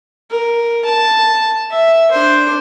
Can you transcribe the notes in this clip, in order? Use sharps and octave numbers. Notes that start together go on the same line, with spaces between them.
A#4
A5
E5
D4 C5